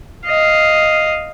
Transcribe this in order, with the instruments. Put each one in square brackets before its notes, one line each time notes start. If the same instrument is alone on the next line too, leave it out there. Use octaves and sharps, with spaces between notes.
[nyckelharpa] D#5 F5